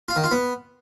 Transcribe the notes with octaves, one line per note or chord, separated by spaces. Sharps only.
F4
D#3
F4
B3